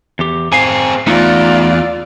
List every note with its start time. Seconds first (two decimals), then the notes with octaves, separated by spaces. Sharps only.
0.19 E2 G4
0.52 C4 G#4 F5 G#5
1.07 E2 A3 D#4 F4 D5